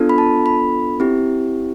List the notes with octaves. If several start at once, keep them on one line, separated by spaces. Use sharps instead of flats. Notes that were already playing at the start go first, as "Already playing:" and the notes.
Already playing: B3 D4 F4 A4
B5
A5
B5
C4 E4 G4